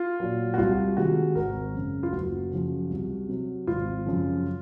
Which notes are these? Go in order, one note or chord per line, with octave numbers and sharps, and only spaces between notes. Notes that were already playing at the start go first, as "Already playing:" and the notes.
Already playing: F4
A#2 F#3
F#4
C2 F4
C3 D#3 G#3 F#4
G#1 A#4
F#2 C#3
F4
F#1 F#4
F#2 C#3 F3
C2
C3 F#3
G#1 F4
F#2 C#3 F3